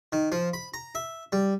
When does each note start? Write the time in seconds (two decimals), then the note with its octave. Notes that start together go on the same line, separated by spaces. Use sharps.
0.12 D#3
0.32 F3
0.53 B5
0.74 A#5
0.95 E5
1.32 G3